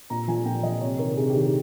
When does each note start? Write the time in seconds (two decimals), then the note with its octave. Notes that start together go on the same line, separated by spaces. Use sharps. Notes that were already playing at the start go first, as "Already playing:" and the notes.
0.10 A#2 A#5
0.28 F3 G#5
0.45 A#2 G5
0.63 F3 D#5
0.81 C3 C#5
0.99 D#3 A#4
1.17 C3 G#4
1.29 G4
1.35 D#3
1.41 G4